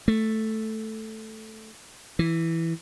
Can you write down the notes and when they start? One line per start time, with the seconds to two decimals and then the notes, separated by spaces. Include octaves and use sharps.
0.08 A3
2.19 E3